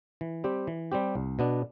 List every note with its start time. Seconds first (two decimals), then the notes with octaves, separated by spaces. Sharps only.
0.21 E3
0.44 G3 C4 G4
0.67 E3
0.92 G3 C4 G4
1.15 C2
1.39 B2 B3 D4